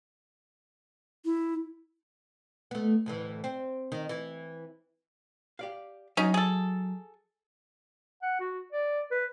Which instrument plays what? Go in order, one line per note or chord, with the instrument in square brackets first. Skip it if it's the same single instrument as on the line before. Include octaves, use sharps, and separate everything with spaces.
[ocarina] E4
[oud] A3 B3
D2 A2 E3
C4
D#3
E3
[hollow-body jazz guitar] G4 D5 F5
[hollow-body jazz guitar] F#3 D#5 [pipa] C#4 D#4
[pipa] G#4 A4
[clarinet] F#5
F#4
D5
B4